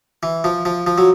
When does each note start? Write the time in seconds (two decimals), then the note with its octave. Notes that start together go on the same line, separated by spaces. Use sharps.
0.23 E3
0.44 F3
0.65 F3
0.87 F3
0.98 F#3